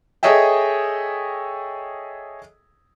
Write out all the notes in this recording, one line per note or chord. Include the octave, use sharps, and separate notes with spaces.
G#4 A4 C#5 D#5 E5 G5